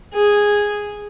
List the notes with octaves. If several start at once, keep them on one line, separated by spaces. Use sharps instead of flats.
G#4